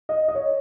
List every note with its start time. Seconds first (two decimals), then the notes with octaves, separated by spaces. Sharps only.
0.09 D#5
0.28 D#5
0.35 C#5